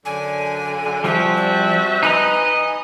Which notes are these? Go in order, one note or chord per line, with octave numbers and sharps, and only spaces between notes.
F#2 D3 G#5
F3 G3 C4 F#4 C5 E5
D5
D#4 B4 D#5 G#5 A#5